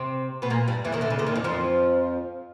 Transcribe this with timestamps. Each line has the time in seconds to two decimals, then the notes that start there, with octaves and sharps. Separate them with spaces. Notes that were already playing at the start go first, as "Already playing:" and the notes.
Already playing: C3 C4
0.42 B2 B3
0.50 A#2 A#3
0.68 G2 G3
0.85 E2 E3
0.92 D#2 D#3
1.01 D2 D3
1.10 C#3
1.19 D2 D3
1.27 D#2 D#3
1.35 E2 E3
1.44 F2 F3